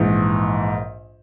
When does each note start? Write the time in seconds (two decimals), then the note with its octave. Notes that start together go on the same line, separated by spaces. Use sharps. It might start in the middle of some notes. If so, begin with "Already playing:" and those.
Already playing: A#1 G#2 E3